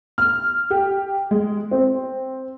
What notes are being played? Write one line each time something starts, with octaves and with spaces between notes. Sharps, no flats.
F6
G4
G#3
C4